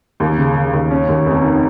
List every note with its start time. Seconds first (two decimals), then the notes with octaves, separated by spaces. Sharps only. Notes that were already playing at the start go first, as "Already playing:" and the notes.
0.20 D#2
0.37 C#3
0.55 C#3
0.73 D#2
0.91 C#4
1.08 D#2
1.26 F1
1.44 D#3